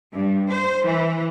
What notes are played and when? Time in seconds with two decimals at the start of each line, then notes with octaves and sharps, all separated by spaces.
0.13 G2
0.50 C5
0.86 E3